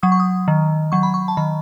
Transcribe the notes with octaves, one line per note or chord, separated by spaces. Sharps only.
F#3 D#6
C#6
D#6
D#3
F#3 C#6
B5
C#6
A5
D#3 B5